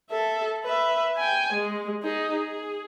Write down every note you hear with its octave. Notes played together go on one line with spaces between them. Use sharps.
A4 E5
B4 E5
G5 G#5
G#3
D#4 G#4
G#4